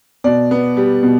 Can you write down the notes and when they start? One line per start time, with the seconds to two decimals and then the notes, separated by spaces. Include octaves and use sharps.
0.24 B2 D5
0.51 B3
0.77 G3
1.03 B2